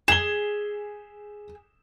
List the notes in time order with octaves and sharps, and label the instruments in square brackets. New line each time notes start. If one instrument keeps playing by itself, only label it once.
[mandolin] G#4 [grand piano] E7 G7